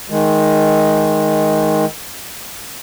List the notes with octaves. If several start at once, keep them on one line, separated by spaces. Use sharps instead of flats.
D#3 G#3